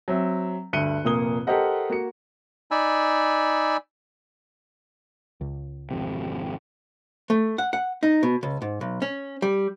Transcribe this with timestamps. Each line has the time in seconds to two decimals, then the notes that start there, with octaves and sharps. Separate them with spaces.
0.08 F#3 C4 E5
0.73 D2 G2 F#6 C#7 D#7 G7
1.04 F1 A#2 A#3 D#6 G7
1.47 G4 A4 A#4 C5 D#5 F#5
1.90 A#3 F#4 C#7
2.71 D#4 D5 G#5 B5 E6
5.41 C#2
5.91 G#1 F2 C3
7.30 A3
7.58 F#5
7.73 F#5
8.03 D#4
8.23 B2
8.43 C#2
8.62 G#2
8.81 B1
9.02 C#4
9.42 G3